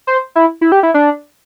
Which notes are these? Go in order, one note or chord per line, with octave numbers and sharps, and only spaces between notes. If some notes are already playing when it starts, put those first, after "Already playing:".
C5
E4
E4
G4
E4
D4